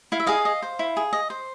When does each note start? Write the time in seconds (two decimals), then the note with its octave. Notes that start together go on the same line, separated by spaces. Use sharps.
0.12 E4 F5
0.20 E5
0.26 G#4 D#5 F5
0.45 D#5
0.63 C5
0.79 E4
0.97 G#4
1.13 D#5
1.30 C5